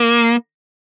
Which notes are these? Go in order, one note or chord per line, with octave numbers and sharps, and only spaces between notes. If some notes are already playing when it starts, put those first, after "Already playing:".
Already playing: A#3